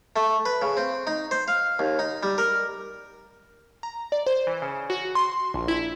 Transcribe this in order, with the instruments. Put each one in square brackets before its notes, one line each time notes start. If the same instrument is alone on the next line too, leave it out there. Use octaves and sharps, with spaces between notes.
[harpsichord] A3
B4
C#3
C4
D#4
C5
F5
D#2
D#4
G3
A#4
[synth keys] A#5
D5
C5
E3
C#3
F#4
C6
A#1
E4